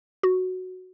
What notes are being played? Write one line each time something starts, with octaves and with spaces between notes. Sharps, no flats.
F#4